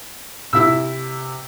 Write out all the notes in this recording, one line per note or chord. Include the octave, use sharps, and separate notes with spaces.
C3 E4 E5 E6